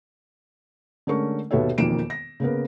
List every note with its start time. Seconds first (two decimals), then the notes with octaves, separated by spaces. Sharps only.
1.07 D3 G#3 A3 C#4 A#4 C#6
1.51 D#2 B2 B3 A4 C#5 E5
1.78 E1 F2 D#3 A#3 D7 E7
2.10 A#6
2.40 C#3 A#3 B3 A#4